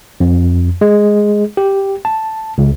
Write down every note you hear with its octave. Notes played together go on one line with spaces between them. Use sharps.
F2
G#3
G4
A5
C#2